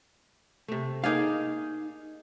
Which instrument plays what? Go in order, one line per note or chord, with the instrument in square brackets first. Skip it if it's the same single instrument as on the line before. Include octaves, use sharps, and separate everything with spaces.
[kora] C3 A3
[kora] A#3 G#4 D5 [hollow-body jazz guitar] D#4 F5